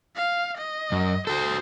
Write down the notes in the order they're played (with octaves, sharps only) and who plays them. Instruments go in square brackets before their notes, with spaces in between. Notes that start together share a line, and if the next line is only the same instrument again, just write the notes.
[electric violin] F5
D#5
[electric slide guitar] F#2
[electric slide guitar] F#4 A4 [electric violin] C5